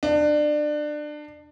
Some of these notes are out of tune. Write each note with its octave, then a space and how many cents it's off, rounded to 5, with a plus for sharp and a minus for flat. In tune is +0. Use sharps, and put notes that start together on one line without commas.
D4 +25